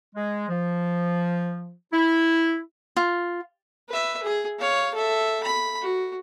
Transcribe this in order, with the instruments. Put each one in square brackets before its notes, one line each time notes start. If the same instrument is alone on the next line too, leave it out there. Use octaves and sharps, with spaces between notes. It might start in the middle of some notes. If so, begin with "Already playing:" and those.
[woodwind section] G#3
F3
E4
[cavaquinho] F4
[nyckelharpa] B4 E5
G#4
C#5 F5
A4 E5
B5
F#4